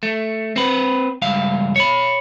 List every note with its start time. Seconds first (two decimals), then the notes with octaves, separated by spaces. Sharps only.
0.03 A3
0.56 C4 B4
1.22 C#2 G2 F5
1.76 C#5 B5